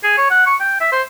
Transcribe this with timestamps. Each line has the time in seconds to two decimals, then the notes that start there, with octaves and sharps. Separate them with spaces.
0.04 G#4
0.18 C#5
0.31 F#5
0.46 C#6
0.61 G5
0.80 E5
0.92 C5